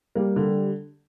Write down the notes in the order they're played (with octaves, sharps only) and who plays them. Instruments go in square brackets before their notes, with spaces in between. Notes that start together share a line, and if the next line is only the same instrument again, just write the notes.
[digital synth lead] G3 [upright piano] A#3
[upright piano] D3